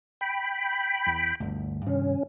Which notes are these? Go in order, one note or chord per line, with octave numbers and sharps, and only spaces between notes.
G5 B5
E2
G1 D2
G2 C3 D#3 C#4